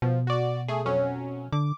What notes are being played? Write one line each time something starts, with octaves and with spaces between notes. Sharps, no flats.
B2 F3
F#4 D5
A3 G#4
F2 F#3 C#4
D3 D6